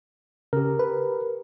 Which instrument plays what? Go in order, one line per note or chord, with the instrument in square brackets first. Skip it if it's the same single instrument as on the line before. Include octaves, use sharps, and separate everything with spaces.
[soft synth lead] C#3 [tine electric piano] G4 A#4
[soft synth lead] B4